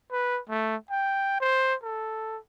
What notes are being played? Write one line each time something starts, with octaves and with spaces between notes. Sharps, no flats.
B4
A3
G5
C5
A4